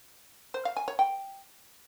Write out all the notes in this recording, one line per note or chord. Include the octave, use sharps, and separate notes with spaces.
C5
F5
G#5
C#5
G5